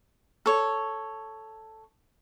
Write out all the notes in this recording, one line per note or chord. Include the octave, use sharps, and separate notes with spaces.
A4 C#5